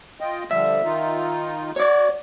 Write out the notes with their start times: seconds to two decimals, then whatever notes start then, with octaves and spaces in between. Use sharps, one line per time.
0.21 F4 D#5 G5
0.51 D3 F3 G3 E5
0.85 D#3 D#4 F4
1.76 F#4 C#5 D5